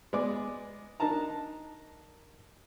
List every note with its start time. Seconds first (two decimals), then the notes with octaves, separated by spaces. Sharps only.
0.13 G#3 B3 D5 D6
1.00 D4 D#4 A#4 A5 A#5